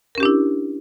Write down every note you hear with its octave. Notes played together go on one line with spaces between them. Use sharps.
C#4 D4 E4 G4 A#4